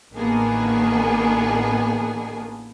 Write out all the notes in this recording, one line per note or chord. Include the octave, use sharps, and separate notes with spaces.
A1 D#3 A#3 B3 D4 G#4